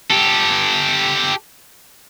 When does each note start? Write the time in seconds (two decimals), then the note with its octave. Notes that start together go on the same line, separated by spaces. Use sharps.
0.10 G4 A4